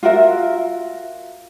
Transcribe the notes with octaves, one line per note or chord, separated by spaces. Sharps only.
F4 F#4 A#4 E5